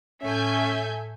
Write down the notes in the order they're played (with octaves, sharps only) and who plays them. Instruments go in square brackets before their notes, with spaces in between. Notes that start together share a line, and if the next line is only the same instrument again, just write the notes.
[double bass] A2 [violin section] A3 G#5 G6 [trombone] C#4 [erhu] E5